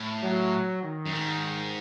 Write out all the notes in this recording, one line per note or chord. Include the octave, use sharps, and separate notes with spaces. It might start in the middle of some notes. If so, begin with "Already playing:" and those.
Already playing: A2
F#3
D#3
F#2
G#2